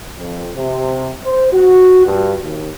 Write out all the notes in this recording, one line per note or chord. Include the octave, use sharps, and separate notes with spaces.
F2
C3
C5
F#4
G2
D#2